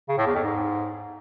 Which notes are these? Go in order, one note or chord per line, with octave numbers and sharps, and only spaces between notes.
C#3
A2
E2
F2
G#2